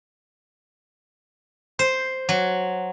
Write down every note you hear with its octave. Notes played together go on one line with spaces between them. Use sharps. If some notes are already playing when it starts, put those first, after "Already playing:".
C5
F#3